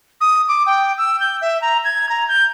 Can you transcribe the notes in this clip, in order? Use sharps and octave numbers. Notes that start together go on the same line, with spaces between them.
D#6
D6
G5
E6
G6
E5
A#5
G#6
A#5
G6